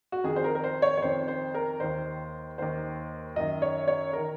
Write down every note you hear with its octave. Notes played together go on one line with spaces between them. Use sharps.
F#4
F2 D#3 G#4
C5
A#4
A#4
C5
C#5
C#5
F2 D#3 C5
C5
A#4
D#2 D#3 C5
D#2 D#3 C5
F#2 D#3 D#5
C#5
C#5
D#3 A#4